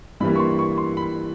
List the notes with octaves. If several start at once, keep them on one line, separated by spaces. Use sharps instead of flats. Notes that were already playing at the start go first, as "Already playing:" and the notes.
G2 E3 G3 A#3 B5
C#6
C6
C#6
C6
B5